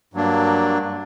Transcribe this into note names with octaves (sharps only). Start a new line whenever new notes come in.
G2 F#3 A#3 D4